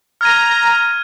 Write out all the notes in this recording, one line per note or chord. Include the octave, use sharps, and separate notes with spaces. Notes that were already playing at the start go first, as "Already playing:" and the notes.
A#5 F6 G#6 D#7